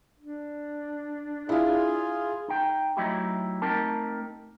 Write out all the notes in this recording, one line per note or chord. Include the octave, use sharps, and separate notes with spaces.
D4
E4 F4 G#4 F5
D#4 G5
F#3 A3 D#4 E4 F#4 G4
A3 C4 D#4 G4 A#4 A5